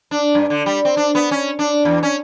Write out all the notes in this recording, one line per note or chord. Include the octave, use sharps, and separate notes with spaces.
D4
G2
D3
G3
C4
D4
B3
C#4
D4
E2
C#4